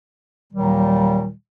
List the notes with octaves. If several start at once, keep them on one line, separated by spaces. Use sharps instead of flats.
D#2 A#2 D#3 F#3 G3